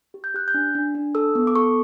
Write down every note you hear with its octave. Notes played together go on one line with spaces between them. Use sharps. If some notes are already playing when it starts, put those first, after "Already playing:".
G4
G6
G4 F#6
G6
D4
D4
D4
A4 E6
B3
D6
A4 C#6